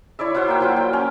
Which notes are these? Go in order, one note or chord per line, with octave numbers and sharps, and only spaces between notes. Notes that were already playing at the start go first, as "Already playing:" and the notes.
E4 C#5 D5 E5
E4 F#4 C5 F#5
A#3 G5
F3 F#3 F4
G5
C#4